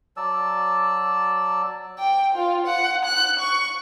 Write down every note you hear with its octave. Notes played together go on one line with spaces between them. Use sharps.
F#3 D5 A5 E6
G5
F4
F#5
F#6
C#6